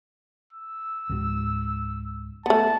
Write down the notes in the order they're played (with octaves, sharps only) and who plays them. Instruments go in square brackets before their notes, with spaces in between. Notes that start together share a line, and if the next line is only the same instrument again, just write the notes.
[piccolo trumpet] E6
[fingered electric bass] C#2 G#2
[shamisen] A3 B3 [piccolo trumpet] A5